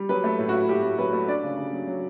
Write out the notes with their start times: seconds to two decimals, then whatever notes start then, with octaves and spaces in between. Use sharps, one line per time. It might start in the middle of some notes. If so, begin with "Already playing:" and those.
Already playing: G3
0.09 F#3 B4
0.24 A3
0.39 A2
0.49 E4 F#4
0.69 A2 G4
0.83 A3
0.98 F#3 B4
1.13 A3
1.28 D4 D5
1.43 C#3
1.57 C#3
1.73 F#3
1.87 F#3